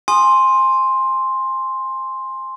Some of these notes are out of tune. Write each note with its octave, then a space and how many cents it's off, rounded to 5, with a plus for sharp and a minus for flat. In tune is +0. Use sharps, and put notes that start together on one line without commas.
G#5 +0 C6 +5 D#6 -15